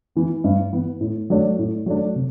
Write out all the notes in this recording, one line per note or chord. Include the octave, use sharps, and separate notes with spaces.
E3 B3
G2
E3 B3
A2
F#3 A3 D4
A2
F#3 A3 D4
C3